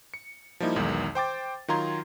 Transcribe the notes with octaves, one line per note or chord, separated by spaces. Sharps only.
C#7
F3 G3 A#3 D#4 E4
B1 E2 D#3 G#3
C5 G5 D6 A6
D#3 F#3 F4 A#5 C6 G#6